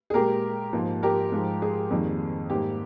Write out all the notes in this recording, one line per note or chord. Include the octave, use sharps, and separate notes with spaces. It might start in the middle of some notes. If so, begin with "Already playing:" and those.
G#4
A#2 G#3 G4 A#4
G#2 F3 A#3
G4 A#4
G#2 F3 G#3
G#4
F2 D#3 G3 A#3
G#2 G3 A#3 G4